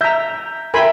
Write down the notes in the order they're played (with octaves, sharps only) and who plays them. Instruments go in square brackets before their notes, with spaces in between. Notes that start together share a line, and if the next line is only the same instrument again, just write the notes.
[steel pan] E5 A#5 [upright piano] G6
[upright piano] A#4 E5 G5 [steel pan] G#5 B5 C6